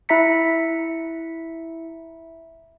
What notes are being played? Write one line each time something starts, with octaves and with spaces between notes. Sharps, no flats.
E4 E5 A#5 B6 C#7